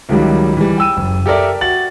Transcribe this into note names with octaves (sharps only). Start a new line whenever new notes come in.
C#2 D#3 F#3 G3
E3 G3
G5 E6 D#7
F#1
G4 A4 A#4 D5 E5
F#4 A6 F#7